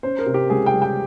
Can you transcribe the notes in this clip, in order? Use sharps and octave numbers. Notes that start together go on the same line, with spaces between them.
C#4 C5
A#4
C3
G4
C#2 G#4
G5
G3
G5